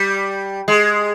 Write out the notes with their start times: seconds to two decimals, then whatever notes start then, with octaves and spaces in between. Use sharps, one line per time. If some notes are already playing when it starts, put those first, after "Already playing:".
Already playing: G3
0.68 G#3